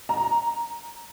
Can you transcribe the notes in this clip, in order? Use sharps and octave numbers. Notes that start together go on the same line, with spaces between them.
A#5